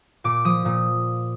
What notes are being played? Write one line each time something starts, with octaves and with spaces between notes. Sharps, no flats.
A#2 D6
F3 D#6
A#2